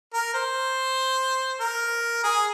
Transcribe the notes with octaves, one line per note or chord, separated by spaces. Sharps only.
A#4
C5
A#4
G#4